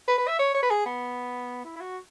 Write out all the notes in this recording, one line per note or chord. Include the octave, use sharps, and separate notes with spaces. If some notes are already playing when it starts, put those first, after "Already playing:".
B4
B4
E5
C#5
C#5
B4
G#4
B3
E4
E4
F#4